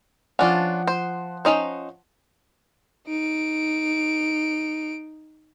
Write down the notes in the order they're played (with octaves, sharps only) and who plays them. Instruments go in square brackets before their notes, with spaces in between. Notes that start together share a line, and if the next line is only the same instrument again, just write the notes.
[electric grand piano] F3 F#5 [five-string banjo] C#4 D4 F4
[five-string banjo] C5
C#4 D#4 C5
[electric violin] D#4 D7